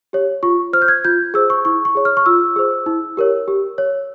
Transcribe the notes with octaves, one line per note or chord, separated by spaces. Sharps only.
G4 C#5
F4 C#6
C5 F6
G6
G#6
F4 G6
G#4 C5 E6
C#6
E4 C#6
C#6
G#4 C#5
F6
C#6
F4 E6
G#4 C5
E4
G4 A#4 C#5
G4
C#5